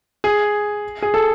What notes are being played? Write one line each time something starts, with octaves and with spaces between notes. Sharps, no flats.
G#4
G#4
A4